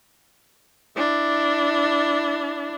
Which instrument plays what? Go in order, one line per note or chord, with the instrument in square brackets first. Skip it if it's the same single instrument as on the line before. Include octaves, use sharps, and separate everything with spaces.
[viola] D4 E4